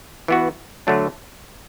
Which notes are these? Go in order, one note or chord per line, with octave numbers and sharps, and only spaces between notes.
E3 B3 F#4
D3 F#3 A3 D4